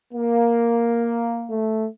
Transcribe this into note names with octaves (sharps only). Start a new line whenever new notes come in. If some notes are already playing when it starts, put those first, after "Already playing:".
A#3
A3